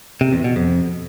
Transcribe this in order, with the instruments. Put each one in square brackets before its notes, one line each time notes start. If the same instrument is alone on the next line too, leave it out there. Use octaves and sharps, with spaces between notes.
[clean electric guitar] C3
E2
B2
F2